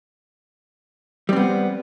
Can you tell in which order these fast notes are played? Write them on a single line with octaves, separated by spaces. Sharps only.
G3 C4 B3